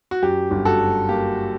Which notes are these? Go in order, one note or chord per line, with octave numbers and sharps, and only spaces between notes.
F#4
F#2 G4
G1
F#4 A4
F#3
A#3 G4